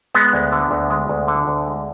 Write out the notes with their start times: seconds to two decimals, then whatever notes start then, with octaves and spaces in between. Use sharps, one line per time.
0.15 G#3 B3
0.33 D2
0.52 D3
0.71 D2
0.90 G#3
1.09 D2
1.28 D3
1.48 D2
1.67 G#3